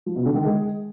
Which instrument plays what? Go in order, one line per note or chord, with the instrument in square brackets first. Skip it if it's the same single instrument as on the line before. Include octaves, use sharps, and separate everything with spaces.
[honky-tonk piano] F3
B2
D3
D#3
G#3